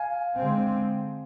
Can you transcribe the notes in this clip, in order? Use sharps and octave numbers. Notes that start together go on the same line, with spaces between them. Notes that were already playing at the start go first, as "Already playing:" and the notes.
Already playing: F5 G#5
D3 G#3 C4